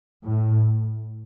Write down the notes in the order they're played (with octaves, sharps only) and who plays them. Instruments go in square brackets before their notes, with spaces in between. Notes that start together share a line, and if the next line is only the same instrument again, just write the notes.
[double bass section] A2